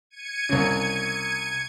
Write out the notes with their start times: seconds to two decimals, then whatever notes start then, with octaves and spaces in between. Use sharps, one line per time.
0.10 G#6 C#7 D#7
0.49 C2 C#3